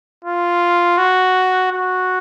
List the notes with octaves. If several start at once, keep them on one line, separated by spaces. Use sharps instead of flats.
F4
F#4
F#4